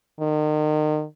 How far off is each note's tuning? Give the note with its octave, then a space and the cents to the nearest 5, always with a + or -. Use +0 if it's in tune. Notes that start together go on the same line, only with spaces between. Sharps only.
D#3 -35